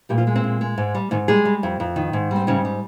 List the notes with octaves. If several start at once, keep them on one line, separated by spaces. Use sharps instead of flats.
A#2 G3 G4
F3 F4
G#3
C4
A#2
G#3
G#2
G3
G#2 D#3 D#4
G3 G#3 G#4
G3
F2
F2
D#3
G#2
G3 C4
G#2 C#3 C#4
G3